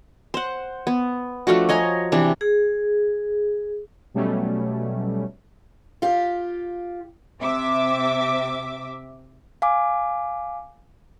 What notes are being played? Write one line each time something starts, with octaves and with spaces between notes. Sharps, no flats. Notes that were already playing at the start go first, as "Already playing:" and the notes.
C5 F#5
B3
F3 A3 D4 F#4
C#5 D#5 G#5 A#5
C3 E3 D4
G#4
B2 F#3 G3 A3 C#4
F4 G4
C3 E5 D6
F5 G#5 D6